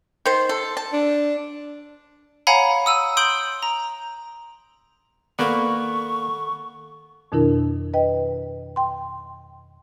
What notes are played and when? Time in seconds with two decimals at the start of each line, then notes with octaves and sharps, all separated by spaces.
0.26 D#3 C5
0.49 A4
0.77 A5
0.93 D4
2.47 C#5 F5 F#5 G#5 A#5 B5
2.86 D#6 E6 D#7
3.17 C6 D#6 G6 D7 F#7
3.63 A#5
5.39 D#3 A#3 B3 A4 D5 F#5 C#6
7.32 F2 B2 D#3 D4 E4 A#4
7.94 B4 D#5 G5
8.76 G5 C6